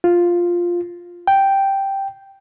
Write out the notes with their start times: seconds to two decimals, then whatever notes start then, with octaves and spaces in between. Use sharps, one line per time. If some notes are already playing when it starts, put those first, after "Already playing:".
0.04 F4
1.27 G5